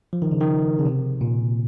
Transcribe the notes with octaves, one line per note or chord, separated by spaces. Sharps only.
F3
D#3
C#3
D#3
C#3
C3
A#2